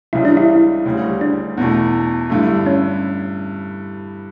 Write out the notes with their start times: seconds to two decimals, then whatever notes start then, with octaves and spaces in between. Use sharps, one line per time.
0.13 C#2 C#3 E3 G3 E4
0.25 D4
0.37 E4
0.85 D2 C#3 G3
1.21 D4
1.57 E2 B2 A3
2.30 G2 D3 A3 E4
2.66 C#4